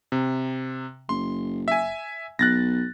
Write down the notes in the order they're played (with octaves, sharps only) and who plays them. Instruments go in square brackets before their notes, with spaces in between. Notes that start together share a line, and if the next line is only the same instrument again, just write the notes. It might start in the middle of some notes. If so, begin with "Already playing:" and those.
[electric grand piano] C3
[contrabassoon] F#1 [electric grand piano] C6
[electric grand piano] E5 G#5
[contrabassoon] B1 [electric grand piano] F#6 A6 A#6